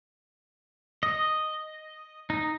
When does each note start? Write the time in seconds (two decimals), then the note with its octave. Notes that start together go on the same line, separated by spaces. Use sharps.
1.03 D#5
2.30 D#4